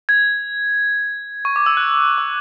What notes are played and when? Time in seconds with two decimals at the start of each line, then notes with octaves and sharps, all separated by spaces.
0.09 G#6
1.45 C#6
1.56 D6
1.66 E6
1.77 F#6
2.18 E6